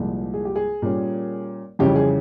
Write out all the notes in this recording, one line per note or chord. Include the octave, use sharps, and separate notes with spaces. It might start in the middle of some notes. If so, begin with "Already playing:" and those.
Already playing: C2 A#2 F3 G#3
G#4
G4
G#4
A#2 G3 A#3 C#4
F2 C#3 E3 G3 C#4 G4
G#4